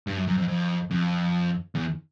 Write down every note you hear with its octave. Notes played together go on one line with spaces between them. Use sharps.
G2
F#2
F#2
F2
F2
F2
E2